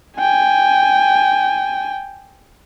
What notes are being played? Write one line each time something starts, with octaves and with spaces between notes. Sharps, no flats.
G5 G#5